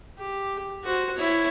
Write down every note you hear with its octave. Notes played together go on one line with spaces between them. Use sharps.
G4
F#4 C5
E4 C#5